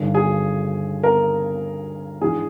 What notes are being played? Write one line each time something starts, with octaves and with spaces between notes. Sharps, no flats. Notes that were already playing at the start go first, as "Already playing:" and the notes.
Already playing: G1 G2 D#3
G#4 G#5
A#4 A#5
A#1 G#2 E3 G#4 G#5